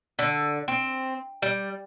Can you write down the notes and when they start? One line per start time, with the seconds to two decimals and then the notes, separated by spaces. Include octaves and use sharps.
0.19 D3
0.68 C4
1.42 G3